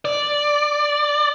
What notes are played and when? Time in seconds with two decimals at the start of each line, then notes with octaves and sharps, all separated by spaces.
0.05 D5